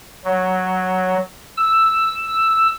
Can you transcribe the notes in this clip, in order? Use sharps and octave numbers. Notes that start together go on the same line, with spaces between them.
F#3
E6